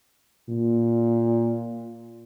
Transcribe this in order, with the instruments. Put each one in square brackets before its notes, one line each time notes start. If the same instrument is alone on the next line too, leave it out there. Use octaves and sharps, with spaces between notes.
[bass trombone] A#2